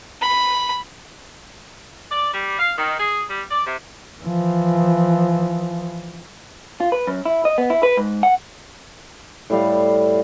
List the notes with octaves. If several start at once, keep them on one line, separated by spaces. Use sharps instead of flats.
B5
D5
G3
F5
D#3
G#4
G3
D5
C3
E3 F3
F4
B4
F#2
E4
D#5
B3
E4
B4
G#2
F#5
A2 G3 F5